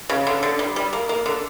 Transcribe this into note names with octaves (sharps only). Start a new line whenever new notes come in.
C#3
D3
D3
G3
G3
A#3
A#3
D3